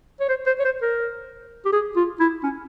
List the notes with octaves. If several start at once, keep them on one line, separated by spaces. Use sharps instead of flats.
C#5
C5
C5
C#5
C5
A#4
G4
G#4
F4
E4
C#4